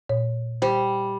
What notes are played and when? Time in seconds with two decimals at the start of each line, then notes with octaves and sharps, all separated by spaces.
0.09 A#2 C#5
0.62 G3 C5